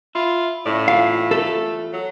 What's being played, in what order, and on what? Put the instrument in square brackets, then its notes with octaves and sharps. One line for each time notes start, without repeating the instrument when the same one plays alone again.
[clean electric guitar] E4 [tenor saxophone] F4
[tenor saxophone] A2 [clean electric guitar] C#3 D5
[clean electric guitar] E2 F4 [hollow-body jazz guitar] F5
[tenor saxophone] A3 [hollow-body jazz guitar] A4
[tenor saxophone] F#3